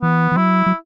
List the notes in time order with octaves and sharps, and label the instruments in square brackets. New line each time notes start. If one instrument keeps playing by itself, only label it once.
[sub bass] E3 [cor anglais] B3
[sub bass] E3
[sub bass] F#3 [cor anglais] E4
[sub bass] F#3